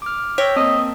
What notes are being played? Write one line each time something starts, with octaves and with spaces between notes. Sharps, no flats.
D6 F6
C#5 G5 E6 A#6 B6
A#3 C4 A#4 D#5 A5